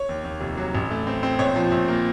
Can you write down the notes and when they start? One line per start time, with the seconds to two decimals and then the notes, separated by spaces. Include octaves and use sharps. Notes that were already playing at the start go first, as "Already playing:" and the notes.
Already playing: C#5
0.09 D#2
0.25 D#2
0.41 F1
0.57 F#3
0.75 A1
0.90 A3
1.07 C4
1.23 C4
1.39 A#1 C#5
1.56 F3
1.72 A#1
1.88 A#3